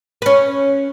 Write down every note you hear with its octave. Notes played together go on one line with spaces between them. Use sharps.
C#4 B4